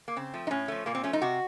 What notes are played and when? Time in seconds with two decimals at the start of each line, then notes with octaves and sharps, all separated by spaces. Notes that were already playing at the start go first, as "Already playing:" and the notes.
0.08 A#3
0.16 C#3 C4
0.34 F3 A3
0.47 D#4
0.51 A2 C#4
0.68 F3 A3
0.86 A#2 A#3
0.95 C4
1.04 F3 A3 C#4
1.13 D#4
1.22 C3 F#4